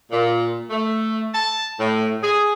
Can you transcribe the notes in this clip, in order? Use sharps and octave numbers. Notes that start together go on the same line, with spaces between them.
A#2
A3
A5
A2
G#4